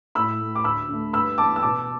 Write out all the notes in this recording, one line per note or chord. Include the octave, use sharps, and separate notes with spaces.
A2 B5 E6
A3
D6
D2 B5 E6
D3 A3
G2 B5 E6
E3 B3 A5 D6
E6
B2 A5 D6